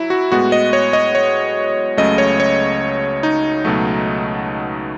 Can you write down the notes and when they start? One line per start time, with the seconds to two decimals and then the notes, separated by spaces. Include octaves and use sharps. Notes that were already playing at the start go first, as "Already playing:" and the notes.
Already playing: F#3 E4
0.10 F#4
0.32 A2 G#3 B3 F#4
0.52 D#5
0.73 C#5
0.93 D#5
1.15 C#5
1.97 C#2 C#3 F#3 A3 D#5
2.18 C#5
2.40 C#5
3.23 D#4
3.65 C#2 B2 F#3 A3